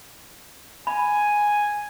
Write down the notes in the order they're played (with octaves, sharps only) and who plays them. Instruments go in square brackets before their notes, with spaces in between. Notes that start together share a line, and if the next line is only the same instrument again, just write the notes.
[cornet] G#5 [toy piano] B5